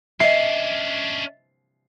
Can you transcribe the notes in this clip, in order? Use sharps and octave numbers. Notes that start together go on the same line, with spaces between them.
C#4 D4 D#5 E5 C7